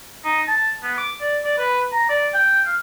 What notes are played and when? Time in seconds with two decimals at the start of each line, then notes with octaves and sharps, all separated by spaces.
0.25 D#4
0.48 A5
0.83 B3
0.98 D6
1.21 D5
1.45 D5
1.58 B4
1.93 A#5
2.09 D5
2.34 G5
2.66 F5